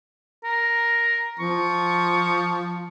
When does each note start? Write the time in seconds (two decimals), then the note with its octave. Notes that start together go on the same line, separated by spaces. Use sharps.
0.44 A#4
1.40 F3 C#6